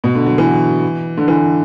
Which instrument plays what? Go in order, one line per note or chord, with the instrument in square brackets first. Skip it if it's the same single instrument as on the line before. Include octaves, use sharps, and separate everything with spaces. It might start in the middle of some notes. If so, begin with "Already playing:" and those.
[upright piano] B2
D3
F#3
E3
D3
E3